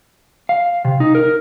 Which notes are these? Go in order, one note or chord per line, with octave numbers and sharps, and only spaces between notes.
F5
C3
D#4
A#4